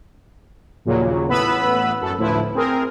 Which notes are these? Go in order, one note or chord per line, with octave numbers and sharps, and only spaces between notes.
A#1 D#2 A#2 C#3 F#3
A1 A2 B3 B4 B5 E6
F#2 A4
D2 A2 F3 E4 B4
C4 G#4 A#4